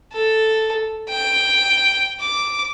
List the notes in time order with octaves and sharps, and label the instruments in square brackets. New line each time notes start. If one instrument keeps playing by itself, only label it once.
[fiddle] A4
G5
D6